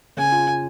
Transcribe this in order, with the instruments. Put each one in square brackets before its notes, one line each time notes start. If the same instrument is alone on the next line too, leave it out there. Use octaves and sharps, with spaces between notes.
[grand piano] C#3 [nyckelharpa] G#5
[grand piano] F4
F4